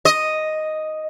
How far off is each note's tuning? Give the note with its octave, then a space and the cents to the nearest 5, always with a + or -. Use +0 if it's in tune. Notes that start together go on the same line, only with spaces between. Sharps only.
D#5 +0